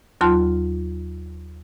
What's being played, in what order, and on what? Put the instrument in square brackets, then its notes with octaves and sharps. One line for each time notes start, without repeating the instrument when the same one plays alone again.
[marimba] D#2 F#3 F4 A5 C6